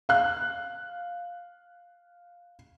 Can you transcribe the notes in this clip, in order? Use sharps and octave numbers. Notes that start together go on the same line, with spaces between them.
F5 F#6